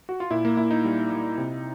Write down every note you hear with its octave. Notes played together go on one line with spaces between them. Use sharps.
F#4
F4
A#2 E4
A#3
A#2 E4
D#4
G3
G3
C3